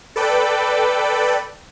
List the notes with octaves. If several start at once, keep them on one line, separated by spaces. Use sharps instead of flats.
A4 B4 D5 G5